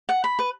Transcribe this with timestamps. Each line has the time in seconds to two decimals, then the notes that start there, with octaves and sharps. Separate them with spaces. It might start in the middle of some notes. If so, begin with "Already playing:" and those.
0.09 F#5
0.24 B5
0.39 B4